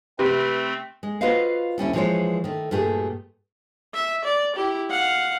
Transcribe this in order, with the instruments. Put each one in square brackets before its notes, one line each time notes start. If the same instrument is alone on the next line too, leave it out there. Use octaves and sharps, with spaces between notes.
[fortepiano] C3 [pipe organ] A3 C4 [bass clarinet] B4
[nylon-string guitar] G#3
F4 F#4 B4 C5 D#5 F5
D2 G3 C#4 E4
E3 F3 G#3 G4 C5 C#5
D#3 A3
G2 A#2 A3 G4 G#4
[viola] E5
D5
E4 G4
F5 F#5